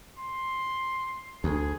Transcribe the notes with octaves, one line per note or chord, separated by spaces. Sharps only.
C6
D2 G#4